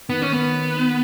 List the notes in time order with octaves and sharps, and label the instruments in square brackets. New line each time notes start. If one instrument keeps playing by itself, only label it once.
[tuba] D#3 [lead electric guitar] B3
[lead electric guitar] C#4
B3